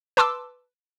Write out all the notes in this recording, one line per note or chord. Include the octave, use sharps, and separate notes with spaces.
B4 A5 C6 D6 E6